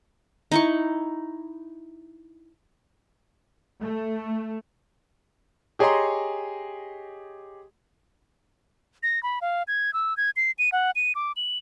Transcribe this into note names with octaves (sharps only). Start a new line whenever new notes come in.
D#4 E4 C#6
A3
G4 G#4 C#5 D#5 A#5 C6
A#6
B5
F5
G#6
E6
G#6
C7
D#7
F#5
D#7
D6
F#7